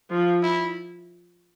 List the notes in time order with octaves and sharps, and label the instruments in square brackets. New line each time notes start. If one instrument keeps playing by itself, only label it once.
[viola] F3 [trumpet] F4
[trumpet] E4